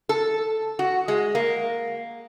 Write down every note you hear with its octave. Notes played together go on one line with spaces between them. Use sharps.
A4
F#4
G#3
A#3